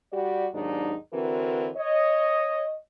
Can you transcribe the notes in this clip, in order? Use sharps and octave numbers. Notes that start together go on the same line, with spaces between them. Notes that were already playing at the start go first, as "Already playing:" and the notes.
G3 F#4 G4 D5
D#2 G#2 F#3 D4 D#4 D5
D3 E3 C4 F#4 A#4
C#5 D#5